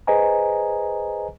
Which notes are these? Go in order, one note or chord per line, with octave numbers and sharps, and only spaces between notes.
G#4 B4 C5 D#5 G#5 A#5